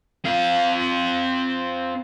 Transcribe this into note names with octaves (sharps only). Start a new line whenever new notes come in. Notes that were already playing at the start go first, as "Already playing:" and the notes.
C4 F5